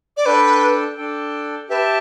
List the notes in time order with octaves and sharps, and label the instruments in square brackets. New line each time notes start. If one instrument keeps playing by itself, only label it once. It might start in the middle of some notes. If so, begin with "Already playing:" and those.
[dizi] D5
[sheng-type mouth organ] D4 A4 G5 [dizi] B4
[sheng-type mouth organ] D4 A4 G5
[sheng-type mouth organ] G4 E5 A5 [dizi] B4